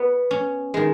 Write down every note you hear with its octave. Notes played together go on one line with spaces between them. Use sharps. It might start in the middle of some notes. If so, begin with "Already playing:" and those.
Already playing: B3
C#4
D#3 G#3